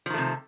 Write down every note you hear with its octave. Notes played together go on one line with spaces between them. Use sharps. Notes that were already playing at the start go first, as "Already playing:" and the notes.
C3 D#3 F3 A3